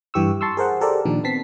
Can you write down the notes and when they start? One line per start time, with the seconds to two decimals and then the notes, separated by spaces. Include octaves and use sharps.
0.14 G2 E3 G4 C#6 E6
0.41 A5 C6 C#6 E6
0.57 G#4 A#4 C5 F#5
0.81 G4 A4 A#4 C5 D5
1.05 A#2 D#3 F3 D4
1.24 B3 C4 A5 B6 C7